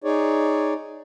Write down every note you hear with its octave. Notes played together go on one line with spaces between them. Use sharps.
D#4 G#4 C#5 D5